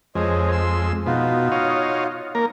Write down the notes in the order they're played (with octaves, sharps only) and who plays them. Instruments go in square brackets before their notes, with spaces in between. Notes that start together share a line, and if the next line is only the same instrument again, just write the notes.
[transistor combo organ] F2 G#3 [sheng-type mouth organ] C5 C#5 D#5
[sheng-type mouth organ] C6 E6
[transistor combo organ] B2 [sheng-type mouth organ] D#4 F4 F#4
[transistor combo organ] C#5 D#5 F5
A#3 A#4